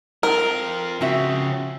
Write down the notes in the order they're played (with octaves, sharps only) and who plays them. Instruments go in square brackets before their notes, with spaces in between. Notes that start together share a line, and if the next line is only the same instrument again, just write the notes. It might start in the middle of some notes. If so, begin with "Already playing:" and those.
[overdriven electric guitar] C4 F4 [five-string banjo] A#4
[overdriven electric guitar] C#3 F3 [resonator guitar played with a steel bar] C4 F#4 E5